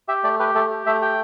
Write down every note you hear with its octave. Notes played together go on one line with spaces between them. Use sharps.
G4 E5
A3 D5
G4 B4
A3 A4
G4
A3 E5
G4 G5